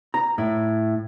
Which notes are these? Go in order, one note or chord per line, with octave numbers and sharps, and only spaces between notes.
A#5
A2